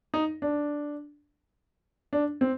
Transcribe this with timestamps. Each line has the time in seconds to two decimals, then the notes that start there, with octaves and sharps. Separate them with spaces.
0.14 D#4
0.42 D4
2.13 D4
2.41 C4